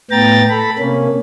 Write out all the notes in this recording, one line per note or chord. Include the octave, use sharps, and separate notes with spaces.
A2 B3 G5 A#5 A6
A4 B5
C3 A#3 C#4